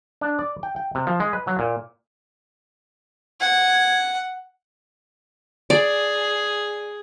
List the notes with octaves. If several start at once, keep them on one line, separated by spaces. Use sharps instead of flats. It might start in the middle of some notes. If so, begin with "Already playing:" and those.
D4
D5
G5
G5
C3
F3
G#3
B4
F#3
A#2
F#5 G#6
G#4 D5